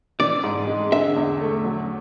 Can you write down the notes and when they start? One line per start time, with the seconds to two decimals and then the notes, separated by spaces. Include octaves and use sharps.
0.19 E3 D5
0.44 G#2
0.67 G#3
0.92 D3 E5
1.16 E2
1.41 A3
1.65 F#3